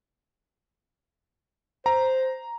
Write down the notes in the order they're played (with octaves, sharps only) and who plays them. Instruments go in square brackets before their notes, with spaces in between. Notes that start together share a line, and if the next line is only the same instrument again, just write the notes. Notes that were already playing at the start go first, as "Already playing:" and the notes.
[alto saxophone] C5 [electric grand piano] A#5